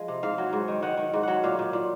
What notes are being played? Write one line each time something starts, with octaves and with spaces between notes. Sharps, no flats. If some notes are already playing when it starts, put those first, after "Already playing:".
Already playing: F3 G#3
C3
G#2 F5
F#3
G#2
D#3
D#3 F#5
D#3
G#2
F#3 F#5
A#2 F5
A#2
A#2